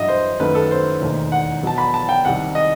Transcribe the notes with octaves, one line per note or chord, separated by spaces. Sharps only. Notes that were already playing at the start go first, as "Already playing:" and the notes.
Already playing: A1 G2 F#3 D#5 E5
C5
F#2 D#3 A3 B4
A4
C5
E1 D#2 D#3 A3
F#5
E2 B2 F#3 A5
B5
A5
G5
C2 C3 D#3 G3 F#5
D#5